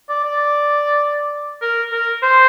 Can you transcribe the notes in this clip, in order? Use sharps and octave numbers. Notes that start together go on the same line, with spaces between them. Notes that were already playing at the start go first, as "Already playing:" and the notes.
D5
D5
A#4
A#4
C5